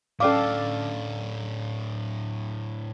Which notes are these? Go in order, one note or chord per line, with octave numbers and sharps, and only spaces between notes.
A2 C#4 D4 A4 D5 F5 D6